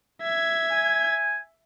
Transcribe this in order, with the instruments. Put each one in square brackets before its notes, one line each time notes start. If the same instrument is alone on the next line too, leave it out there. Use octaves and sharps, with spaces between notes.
[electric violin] E5 G#6
[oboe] G#5